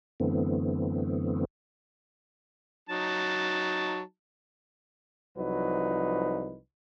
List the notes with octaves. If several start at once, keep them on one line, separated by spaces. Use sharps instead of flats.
F#2 D3 E3 A3 B3 C4
F#3 D#4 A5
C2 F3 F#3 D#4 B4